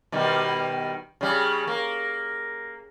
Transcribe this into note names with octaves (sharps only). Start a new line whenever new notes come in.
B2 D#3 G3
C#3 G3
A#3